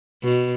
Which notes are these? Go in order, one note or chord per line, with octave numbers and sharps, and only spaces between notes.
B2